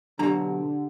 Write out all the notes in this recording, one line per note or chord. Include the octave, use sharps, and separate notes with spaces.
B1 D3 F#3 D4 G4 A#5